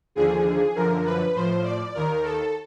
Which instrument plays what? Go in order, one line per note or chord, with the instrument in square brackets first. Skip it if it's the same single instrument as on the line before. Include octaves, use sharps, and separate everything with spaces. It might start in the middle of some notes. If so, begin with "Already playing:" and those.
[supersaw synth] D#2 D3 F3 G#4
F#2 D3 F3 A#4
B4
A2 F3 C5
D5
D#2 D#3 A#4
A4